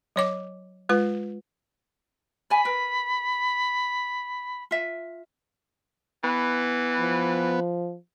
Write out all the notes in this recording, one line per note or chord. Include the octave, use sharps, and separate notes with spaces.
F#3 C#5 D6
G#3 F4 B4
D5 G#5 B5
A#4 B4
F4 E5
E3 B3
F3